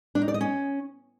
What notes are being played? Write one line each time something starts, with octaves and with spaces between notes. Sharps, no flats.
D4
D#4
D5
D#5
C#4